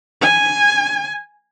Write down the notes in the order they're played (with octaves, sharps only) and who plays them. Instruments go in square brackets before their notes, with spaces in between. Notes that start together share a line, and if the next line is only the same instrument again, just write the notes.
[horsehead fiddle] G#5